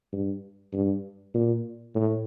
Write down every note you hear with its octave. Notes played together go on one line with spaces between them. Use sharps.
G2
G2
A#2
A2